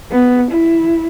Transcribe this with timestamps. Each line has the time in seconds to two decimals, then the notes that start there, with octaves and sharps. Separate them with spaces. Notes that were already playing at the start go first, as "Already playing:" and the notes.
0.12 B3
0.51 E4